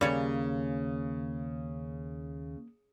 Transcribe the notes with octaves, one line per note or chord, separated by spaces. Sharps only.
D#2 C#3 G3 A#3 G#4 C#5 D5